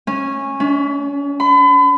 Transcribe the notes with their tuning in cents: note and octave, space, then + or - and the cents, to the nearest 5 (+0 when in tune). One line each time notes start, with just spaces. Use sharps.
C#4 -15
C#4 +40
B5 +40